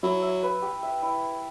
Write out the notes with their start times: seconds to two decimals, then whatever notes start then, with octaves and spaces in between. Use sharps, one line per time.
0.03 F#3 E4
0.22 E5
0.43 B4
0.62 G4
0.83 E5
1.02 E4